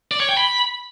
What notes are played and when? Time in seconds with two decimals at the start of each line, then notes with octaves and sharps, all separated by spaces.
0.11 D5
0.20 C#5
0.29 G5
0.37 B5